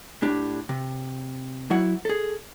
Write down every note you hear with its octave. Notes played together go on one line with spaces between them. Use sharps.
A2 D4 G4
C3
F#3 E4 F#5
G#4 A4